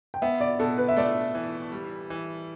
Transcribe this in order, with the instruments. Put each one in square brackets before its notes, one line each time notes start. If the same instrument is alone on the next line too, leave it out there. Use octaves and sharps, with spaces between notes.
[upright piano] G5
[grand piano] B3 [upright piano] E5
[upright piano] D5
[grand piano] B2 [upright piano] A4
[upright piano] B4
E5
[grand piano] A3 [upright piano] D5
[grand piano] E3
G3
E3